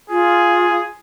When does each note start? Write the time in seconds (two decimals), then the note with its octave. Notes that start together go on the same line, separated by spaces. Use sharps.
0.10 F4 G#4